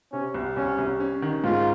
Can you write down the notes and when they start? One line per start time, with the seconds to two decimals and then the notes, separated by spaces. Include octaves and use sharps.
0.12 C3 C#4
0.34 C2
0.56 C2 C#4
0.78 C2
1.00 C#4
1.22 D#3
1.44 G#2 F4